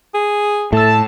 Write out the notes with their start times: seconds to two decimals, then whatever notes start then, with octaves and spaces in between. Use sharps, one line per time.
0.14 G#4
0.73 A2 A3 A5 E6